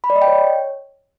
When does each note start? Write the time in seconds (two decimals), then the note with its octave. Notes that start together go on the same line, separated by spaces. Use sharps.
0.04 B5
0.10 D5
0.16 D#5
0.22 G5
0.28 C#5